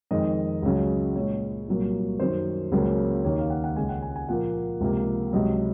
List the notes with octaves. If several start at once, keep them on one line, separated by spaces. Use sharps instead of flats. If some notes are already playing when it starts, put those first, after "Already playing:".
F2 D#3 G#3 D#5
C#2 C#3 F#3
A#2 G#3 C#5
C2 A#2 F#3 A#3
F#2 D#3 F#3 C5
C#2 C#3 F#3 A#3
D#2 D#3 A#3 C#5
F5
F#5
F#5
C#2 C#3 G#3 G#5
F#5
G#5
G#5
A#2 F3 A#3 F#5
C#2 C3 F3 A#3
C#2 C3 F#3 D#5